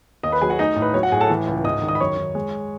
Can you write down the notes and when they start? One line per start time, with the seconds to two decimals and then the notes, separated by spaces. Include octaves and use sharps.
0.23 D#2 D#5 D#6
0.32 B4 B5
0.41 F#3 G#4 G#5
0.50 F#4 F#5
0.59 A3 D#4 D#5
0.76 A2
0.82 B4
0.94 F#3 C#5
1.03 F#4 F#5
1.12 A2 G#4 G#5
1.21 A4 A5
1.30 E3
1.47 C#2
1.64 G#2 D#5 D#6
1.82 D#3
1.88 D#5 D#6
1.95 B5
2.00 F#2 C#5 C#6
2.17 D#3
2.35 G#3